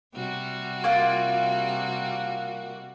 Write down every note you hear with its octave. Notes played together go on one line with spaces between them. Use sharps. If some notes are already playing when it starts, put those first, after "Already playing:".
C3 G3 F#4
A#3 F4 D6